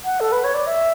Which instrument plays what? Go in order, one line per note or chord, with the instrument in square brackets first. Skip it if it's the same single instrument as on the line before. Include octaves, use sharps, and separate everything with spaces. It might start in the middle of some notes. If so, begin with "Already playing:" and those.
[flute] F#5
A4
B4
C#5
D5
E5